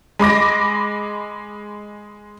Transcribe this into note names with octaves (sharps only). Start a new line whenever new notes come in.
G#3 B5 D6 A#6